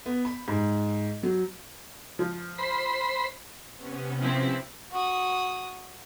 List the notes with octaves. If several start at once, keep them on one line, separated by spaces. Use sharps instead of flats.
B3
B5
G#2
F#3
F3
C5 B5
C3 B3 C#4
F3 C4 E4
F#4 D#6